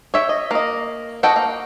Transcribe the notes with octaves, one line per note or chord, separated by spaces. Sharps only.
C#5 E5 G5
D#5
A#3 D#5
F#4 A4 D#5 G5
A#3